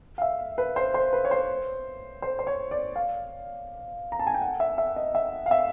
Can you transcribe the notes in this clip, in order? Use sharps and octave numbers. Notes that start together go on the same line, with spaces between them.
F5
E5
B4
C5
C5
B4
C#5
C5
C5
C5
C#5
D5
F5
A#5
A5
G#5
G5
F#5
E5
E5
D#5
E5
F5
E5